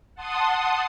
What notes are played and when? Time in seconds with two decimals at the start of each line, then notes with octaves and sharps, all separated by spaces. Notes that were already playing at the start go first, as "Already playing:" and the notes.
0.15 F#5 A5 C6 D#6